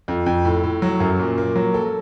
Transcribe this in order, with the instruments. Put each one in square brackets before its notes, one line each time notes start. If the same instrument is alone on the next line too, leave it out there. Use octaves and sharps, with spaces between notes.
[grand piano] F2
F2
A2
A2
F#3
F#2
A#2
A#3
F#3
A4